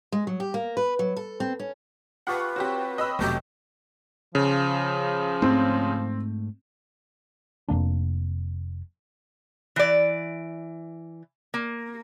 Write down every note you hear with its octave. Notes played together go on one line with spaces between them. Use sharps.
G#3
F#3
G4
A#3
B4
F#3
A4
C4
C#4
F4 G4 B4 F#5 A5 C#6
C4 F#4 G4 C#5
D#5 B5 E6
F1 B2 F#3 A3 G4
C#3 F3
G#2 A3 C4
F1 G2 A#3 D4
E3 D5
A#3